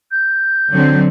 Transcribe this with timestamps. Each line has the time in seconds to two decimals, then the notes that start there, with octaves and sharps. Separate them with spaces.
0.11 G6
0.73 D3 F#3 C4